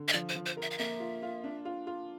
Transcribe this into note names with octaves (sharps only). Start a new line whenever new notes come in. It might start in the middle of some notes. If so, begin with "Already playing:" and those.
Already playing: D3
E5
F3 D5
C5
F3
C5
A#4
E5
F5
A#3 E5
F4
F4
D4
F4
F4